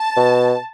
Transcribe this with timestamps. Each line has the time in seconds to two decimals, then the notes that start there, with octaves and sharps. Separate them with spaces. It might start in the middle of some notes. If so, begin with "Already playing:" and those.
Already playing: A5
0.17 B2